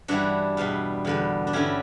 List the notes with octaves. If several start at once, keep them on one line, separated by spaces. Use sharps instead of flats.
G2 E3 G3 D4 F#4
E2 B2 G3
E2 D3 G3
D4
G2 D3 G3 C#4 E4